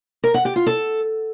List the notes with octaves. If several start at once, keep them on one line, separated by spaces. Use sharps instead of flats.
A#4
F#5
G4
F4
A4